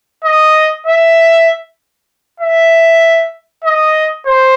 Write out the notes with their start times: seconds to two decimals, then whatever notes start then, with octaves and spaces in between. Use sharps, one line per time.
0.24 D#5
0.87 E5
2.40 E5
3.64 D#5
4.26 C5